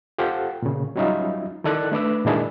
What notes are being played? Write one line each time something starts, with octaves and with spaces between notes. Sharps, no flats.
F4 G4 A4 C5 F#5 G5
A#2 C#3
F#3 G3 C#4 D#4 F4 E5
D#3 E4 A4 D5 F#6
A3 D4 B4 D6 E6
A#2 D#3 G#3 D4 E4 G#4